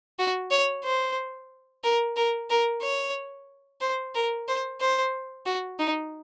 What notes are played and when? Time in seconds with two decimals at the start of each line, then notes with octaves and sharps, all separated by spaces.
0.19 F#4
0.51 C#5
0.84 C5
1.84 A#4
2.16 A#4
2.50 A#4
2.82 C#5
3.81 C5
4.14 A#4
4.48 C5
4.81 C5
5.46 F#4
5.79 D#4